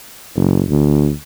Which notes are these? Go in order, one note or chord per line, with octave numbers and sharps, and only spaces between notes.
F#1
D2